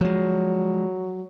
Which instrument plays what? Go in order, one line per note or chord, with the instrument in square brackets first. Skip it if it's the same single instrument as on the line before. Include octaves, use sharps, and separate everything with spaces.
[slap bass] F3 G#3 [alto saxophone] F#3